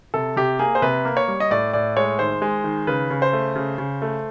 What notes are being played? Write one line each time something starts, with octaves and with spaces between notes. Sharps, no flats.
C3 A4
C3 G4
A#3 G#4
C5
C3 B4
A#3
C#5
G3
D#5
A2 D5
A2 D5
G#3 C#5
D#3 C5
G#3
D#3
C#3 B4
C#3
C5
A3
C#3
C#3
A3